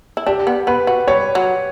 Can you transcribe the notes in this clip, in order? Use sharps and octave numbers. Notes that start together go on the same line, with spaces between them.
E4
D4 G4
B3
B3 B4
F#4
G3 C#5
F#3